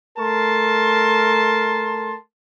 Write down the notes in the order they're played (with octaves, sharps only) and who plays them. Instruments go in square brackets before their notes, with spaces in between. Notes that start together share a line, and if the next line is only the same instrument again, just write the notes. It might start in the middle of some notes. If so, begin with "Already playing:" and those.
[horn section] A3 A#4 A5 C6